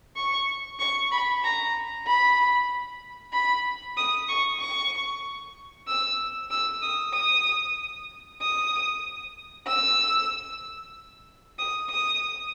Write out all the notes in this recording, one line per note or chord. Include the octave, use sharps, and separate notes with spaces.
C#6
C#6
B5
A#5
B5
B5
D#6
C#6
C#6
E6
E6
D#6
D#6
D#6
E6
D#6
D#6